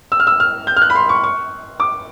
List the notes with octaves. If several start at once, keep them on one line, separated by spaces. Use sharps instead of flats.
E6
F6
E6
F6
G6
F6
F#6
B5
C6
C#6
C#6
D6